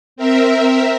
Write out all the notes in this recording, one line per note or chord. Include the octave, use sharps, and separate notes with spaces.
C4 A#4 E5